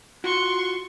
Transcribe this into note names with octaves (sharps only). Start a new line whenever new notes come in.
F4 F#4 C6 C#6